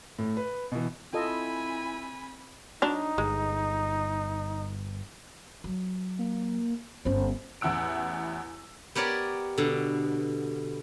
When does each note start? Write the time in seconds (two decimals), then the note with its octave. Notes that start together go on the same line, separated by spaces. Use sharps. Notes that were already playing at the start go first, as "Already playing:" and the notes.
0.19 A2
0.37 B4
0.72 B2 E3
1.13 C4 E4 F4 A4 D#5 G#5 B5
2.82 F#3 D4 D#4 A#5
3.18 G1 G#3
5.64 F#3
6.19 A#3
7.05 G1 C#4 C5
7.61 A1 E2 E4 F#5 E6 D7
8.95 B3 G4 A#4 C#5 D5
9.58 B2 D3